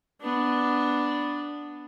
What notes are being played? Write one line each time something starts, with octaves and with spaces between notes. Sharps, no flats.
B3 D4